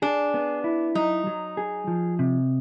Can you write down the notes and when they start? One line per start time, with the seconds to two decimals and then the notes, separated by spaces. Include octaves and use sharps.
0.02 D4 G#4
0.34 B3
0.64 E4
0.95 F#3 D#4
1.27 F#3
1.57 G#4
1.87 F3
2.19 C3